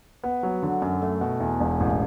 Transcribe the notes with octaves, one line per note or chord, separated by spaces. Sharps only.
B3
F#3
D3
F#2
A3
B2
E2
E1
A1